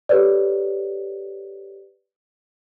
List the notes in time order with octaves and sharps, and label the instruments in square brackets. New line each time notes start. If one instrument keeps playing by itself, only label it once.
[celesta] G4 A4 B4 C#5 D5